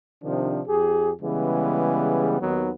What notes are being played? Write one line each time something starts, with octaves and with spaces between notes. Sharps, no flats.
C3 D#3 F3 D4
F2 G4 G#4
C#3 E3 G3 G#3 B3
D#2 D#3 F#3 B3